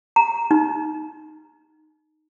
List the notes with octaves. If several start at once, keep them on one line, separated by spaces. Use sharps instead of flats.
A#5
D#4